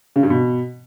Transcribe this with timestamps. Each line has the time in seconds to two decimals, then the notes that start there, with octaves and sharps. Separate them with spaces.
0.16 C#3
0.23 G2
0.30 B2